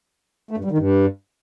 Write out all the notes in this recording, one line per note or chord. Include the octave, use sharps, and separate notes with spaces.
A3
G2
G3
D#3
G2